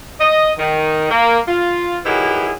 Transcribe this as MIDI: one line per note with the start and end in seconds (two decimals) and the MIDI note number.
0.20 0.51 75
0.59 1.08 51
1.11 1.39 58
1.48 1.99 65
2.06 2.53 51
2.06 2.53 54
2.06 2.53 64
2.06 2.53 67
2.06 2.53 68
2.06 2.53 71